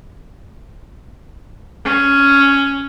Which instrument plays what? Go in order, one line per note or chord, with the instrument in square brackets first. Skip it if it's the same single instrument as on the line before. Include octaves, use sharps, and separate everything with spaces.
[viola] C#4